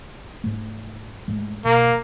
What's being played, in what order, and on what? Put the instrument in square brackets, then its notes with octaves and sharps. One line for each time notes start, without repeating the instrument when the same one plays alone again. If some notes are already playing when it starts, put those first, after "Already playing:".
[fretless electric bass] G#2 A3
G#2 G#3 A3
[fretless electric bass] B2 [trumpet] A#3